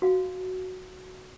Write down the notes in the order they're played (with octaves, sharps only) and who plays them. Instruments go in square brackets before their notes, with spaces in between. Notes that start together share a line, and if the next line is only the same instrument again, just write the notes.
[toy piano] F#4 F5